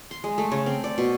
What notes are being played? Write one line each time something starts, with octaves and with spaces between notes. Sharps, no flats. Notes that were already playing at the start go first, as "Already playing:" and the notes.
C6
G#3
A3
C#3
C4
D5
B2